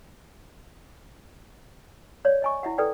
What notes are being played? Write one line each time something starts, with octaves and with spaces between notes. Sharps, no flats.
C#5 D5 F5
D#5 G#5 C#6
E4 E5 F#5
A4 B4 D5 G5